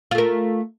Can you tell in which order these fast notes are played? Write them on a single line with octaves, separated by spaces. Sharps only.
F4 A3 A#4